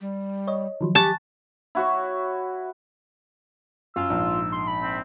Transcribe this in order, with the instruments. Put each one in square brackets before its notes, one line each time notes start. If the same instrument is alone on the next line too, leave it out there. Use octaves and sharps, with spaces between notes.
[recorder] G3
[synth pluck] C#5 D#5
D#3 F3 F#3
[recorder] G4 [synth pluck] G#5 C#6 F#6 [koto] A5
[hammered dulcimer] E4 F#4 C#5
[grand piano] F#2 [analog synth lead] F4 [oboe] E6
[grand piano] A#1 G#2
[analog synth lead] C6
B5
[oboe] C4